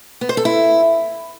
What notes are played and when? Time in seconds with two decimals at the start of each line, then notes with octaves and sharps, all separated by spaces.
0.21 B3
0.29 C5
0.37 A4
0.45 E4